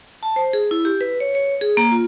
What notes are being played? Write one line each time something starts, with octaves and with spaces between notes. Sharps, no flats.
A5
C5
G#4
E4
G4
B4
C#5
C#5
G#4
A#3
F4